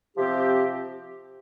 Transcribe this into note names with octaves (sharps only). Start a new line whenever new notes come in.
C3 F3 C4 G4